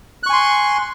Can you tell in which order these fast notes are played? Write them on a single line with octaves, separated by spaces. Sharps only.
F#6 C#6 G#5 C6